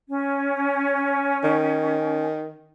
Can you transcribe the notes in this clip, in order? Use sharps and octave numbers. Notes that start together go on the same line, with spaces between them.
C#4
D#3